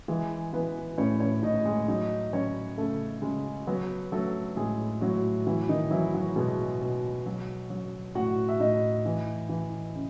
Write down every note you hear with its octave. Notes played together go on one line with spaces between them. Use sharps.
E3 G#3 G#4
E3 B3 B4
A2 C#4 C#5
C#4 C#5
A2 D#4 D#5
G#3 G#4
F#3 D#4 D#5
F#3 C#4 C#5
C#3 A3 A4
C#3 G#3 G#4
F#3 B3 B4
F#3 A3 A4
A2 G#3 G#4
A2 F#3 F#4
E3 F#3 E4
D#3 D#4
E3 F#3 E4
F#3 F#4
B2 G#3 G#4
B2
F#3
F#3
A2 F#4 F#5
E5
A2 D#4 D#5
E3
E3
C#3